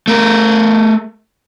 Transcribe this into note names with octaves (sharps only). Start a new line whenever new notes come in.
A3 A#4